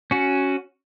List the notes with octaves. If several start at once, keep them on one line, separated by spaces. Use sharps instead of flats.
C#4 F#4